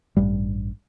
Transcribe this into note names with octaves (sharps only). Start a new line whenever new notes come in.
A1 G2 G3